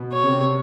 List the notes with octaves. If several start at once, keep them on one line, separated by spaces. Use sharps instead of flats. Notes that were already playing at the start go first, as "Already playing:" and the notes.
Already playing: B2
C#5
C#3
C3